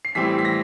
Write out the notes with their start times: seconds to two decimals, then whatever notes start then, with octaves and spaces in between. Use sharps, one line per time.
0.05 C7
0.15 A2 E3 G3 C4 B6
0.39 B6
0.45 A#6